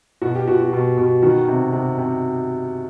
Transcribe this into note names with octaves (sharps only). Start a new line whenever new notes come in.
B2 F#4
G4
B2 F#4
F#4
B2
B2
D#3 F#4
C3
C3
C3